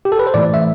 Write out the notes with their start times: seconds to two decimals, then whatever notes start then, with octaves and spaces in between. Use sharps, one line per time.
0.05 G4
0.12 A4
0.19 B4
0.27 C5
0.34 A2 E3 A3 D5
0.54 E5